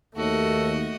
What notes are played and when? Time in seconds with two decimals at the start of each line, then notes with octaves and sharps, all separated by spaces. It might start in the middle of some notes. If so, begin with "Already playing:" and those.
0.16 D#2 A3 F#4 A4 D#5